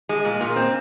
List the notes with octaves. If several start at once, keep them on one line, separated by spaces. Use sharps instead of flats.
G#3
A#2
A#2
C4